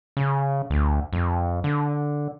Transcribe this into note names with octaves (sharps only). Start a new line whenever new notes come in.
C#3
D2
F2
D3